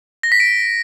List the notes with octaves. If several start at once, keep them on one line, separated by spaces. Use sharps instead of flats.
A#6
B6
D7